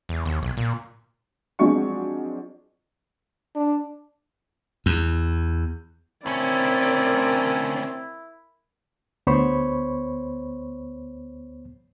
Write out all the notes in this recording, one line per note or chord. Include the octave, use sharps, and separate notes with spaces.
E2
D#2
B1
A#2
F3 F#3 G#3 C4 D4 C#6
D4
E2
D2 C4 C#4 E4 A#4 D5
D2 B3 C5 C#5 B5 C#6